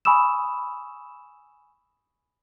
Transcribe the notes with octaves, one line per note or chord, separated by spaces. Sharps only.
G#5 B5 C#6 D#6 E6 E7